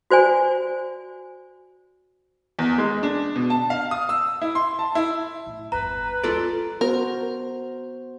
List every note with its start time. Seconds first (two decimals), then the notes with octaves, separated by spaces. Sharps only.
0.11 F#4 C5 D5 G#5
2.59 E2
2.78 G#3
3.03 D4
3.36 B2
3.50 A5
3.70 F5
3.91 D#6
4.09 E6
4.42 E4
4.55 C6
4.79 A5
4.95 E4
5.46 A2
5.72 G1 E2 B4 A#5
6.24 G1 D#2 F4 A4 D5
6.81 B3 F#4 A#4 C5